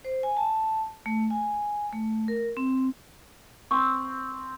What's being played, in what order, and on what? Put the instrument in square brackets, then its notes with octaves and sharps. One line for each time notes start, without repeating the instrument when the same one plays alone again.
[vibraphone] C5
G#5
A5
A3
G#5
A3
A#4
C4
[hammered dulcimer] C4 [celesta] C#6